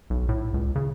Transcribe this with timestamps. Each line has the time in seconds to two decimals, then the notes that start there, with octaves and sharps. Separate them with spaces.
0.10 B1
0.29 A2
0.54 C#2
0.75 C#3